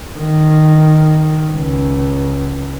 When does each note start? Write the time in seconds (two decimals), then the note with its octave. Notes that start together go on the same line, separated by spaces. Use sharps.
0.18 D#3
1.51 C#2